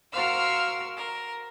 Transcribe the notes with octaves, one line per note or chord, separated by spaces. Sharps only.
F#4 A#4 C5 F5 E6 F6
A#4